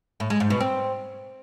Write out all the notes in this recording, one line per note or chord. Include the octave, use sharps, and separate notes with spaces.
A2
G#3
G#2
B2
C4